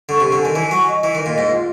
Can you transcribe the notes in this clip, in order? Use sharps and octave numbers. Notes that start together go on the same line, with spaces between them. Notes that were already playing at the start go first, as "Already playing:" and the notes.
D3 C#6
C3 C#6
D3
D#3 G#5
E3 G#5
F#3 C#6
D#5
E3 D#5
D#3 D#5
A#2
G#2 D#5
F4